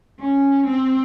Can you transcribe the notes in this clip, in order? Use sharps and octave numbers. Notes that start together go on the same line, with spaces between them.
C#4
C4